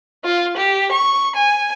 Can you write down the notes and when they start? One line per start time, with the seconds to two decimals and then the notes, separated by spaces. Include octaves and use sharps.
0.24 F4
0.57 G4
0.92 C#6
1.36 G#5